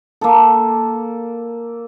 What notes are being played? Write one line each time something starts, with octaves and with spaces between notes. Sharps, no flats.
A#3 A4